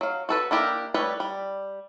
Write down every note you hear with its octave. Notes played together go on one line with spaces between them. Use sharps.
F#3 F5
F#4 A4 B4
A#3 D4 E4 G4 A#4
G3 A3 B4 C#5
G3